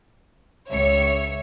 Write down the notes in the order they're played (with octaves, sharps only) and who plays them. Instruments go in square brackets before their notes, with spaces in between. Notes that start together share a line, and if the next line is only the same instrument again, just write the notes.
[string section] C#2 C#5 E5 C#7